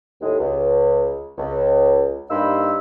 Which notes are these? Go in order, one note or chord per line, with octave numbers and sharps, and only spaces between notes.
D#2 A2 G#3
C#2
C#2
G2 A#3 D#4 C5 B5 E6